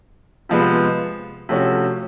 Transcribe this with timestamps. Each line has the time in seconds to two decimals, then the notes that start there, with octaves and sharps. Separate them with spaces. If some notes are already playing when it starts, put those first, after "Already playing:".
0.49 C3 F3 G#3 B3
1.49 C3 F3 A3 C#4 F#4